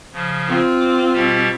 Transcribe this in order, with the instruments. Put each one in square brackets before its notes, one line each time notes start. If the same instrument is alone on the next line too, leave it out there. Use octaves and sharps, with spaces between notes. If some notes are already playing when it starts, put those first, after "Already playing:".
[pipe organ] C#3 F3
[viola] C4 F4
[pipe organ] D6
B2 G3 G4